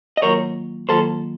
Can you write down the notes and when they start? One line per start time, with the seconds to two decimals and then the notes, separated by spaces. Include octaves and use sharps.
0.17 D#5
0.22 D#3 F#3 A#3 F4 A#4 C#5
0.89 D#3 F#3 A#3 F4 A4 C5